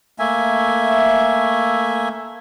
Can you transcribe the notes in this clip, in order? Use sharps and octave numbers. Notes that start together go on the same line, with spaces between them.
A3 A#3 E5 G#5